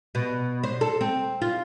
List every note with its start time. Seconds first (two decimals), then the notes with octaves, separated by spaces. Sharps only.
0.15 B2
0.63 C5
0.81 A4
1.01 C4
1.42 F4